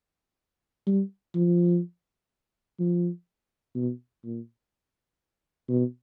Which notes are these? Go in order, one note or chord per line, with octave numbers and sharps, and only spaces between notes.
G3
F3
F3
B2
A#2
B2